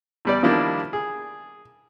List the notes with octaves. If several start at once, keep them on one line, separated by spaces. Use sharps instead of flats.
E2 G3 D5
D#3 F3 G3 A#3 D4 E4
G#4